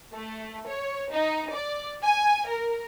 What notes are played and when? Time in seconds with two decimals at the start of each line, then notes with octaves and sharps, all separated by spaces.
0.13 A3
0.68 C#5
1.11 D#4
1.54 D5
2.03 G#5
2.47 A#4